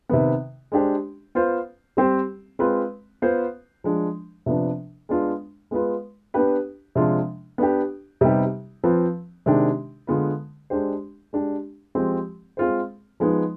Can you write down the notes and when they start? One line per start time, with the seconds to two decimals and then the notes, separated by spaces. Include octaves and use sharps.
0.09 C3 D#3 B3
0.72 G#3 D4 G4 C5
1.35 B3 F4 C5
1.97 G3 C4 G4 C5
2.59 G#3 C4 F4 B4
3.22 B3 F4 C5
3.84 F3 G#3 D4
4.46 C3 F3 B3 D4
5.09 G#3 B3 D4 F4
5.71 G#3 B3 F4 B4
6.34 B3 D4 G4 B4
6.95 C3 F3 G#3 D4 F4
7.58 B3 D4 G4
8.21 C3 G3 B3 D#4 G4
8.84 F3 C4 F4 B4
9.46 C3 D#3 G#3 D4 G4
10.07 D3 G#3 B3 F4 B4
10.70 G#3 D4 G4 C5
11.33 G#3 D4 G4
11.95 F3 G#3 C4 G4
12.57 G#3 C4 F4 G#4 C5
13.20 F3 G#3 B3 D#4